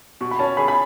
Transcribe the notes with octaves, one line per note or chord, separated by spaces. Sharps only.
B2 C#6
B5
C#4 A5
G#4 B5
B5